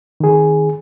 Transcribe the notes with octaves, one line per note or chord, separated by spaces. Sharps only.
D#3 G#4